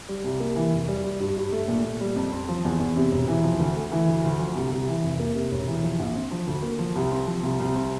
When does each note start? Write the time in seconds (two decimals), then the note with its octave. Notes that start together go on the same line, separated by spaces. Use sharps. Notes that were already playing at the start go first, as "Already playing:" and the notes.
0.09 G3
0.24 C2
0.40 A#3
0.56 E3
0.73 F1
0.88 G3
1.04 G3
1.20 G2
1.37 G2
1.52 A3
1.68 A#2
1.84 A#2
2.01 G3
2.16 F2
2.32 C4
2.49 F3
2.65 E2
2.80 E2
2.96 C3
3.12 E1
3.28 E3
3.44 F3
3.59 D2
3.76 A3
3.92 E3
4.07 D2
4.24 D2
4.39 F3
4.56 C2
4.72 C2
4.87 E3
5.03 F1
5.20 A#3
5.35 C3
5.52 E1
5.68 E3
5.83 F3
5.99 A#1
6.15 C4
6.31 F3
6.47 D2
6.63 A#3
6.79 F3
6.96 C2
7.11 C4
7.27 F3
7.43 C2
7.59 C2
7.74 C4